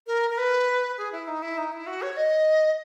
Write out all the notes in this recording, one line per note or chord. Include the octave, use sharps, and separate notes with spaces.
A#4
A#4
B4
G#4
E4
D#4
E4
D#4
E4
F#4
C#5
D#5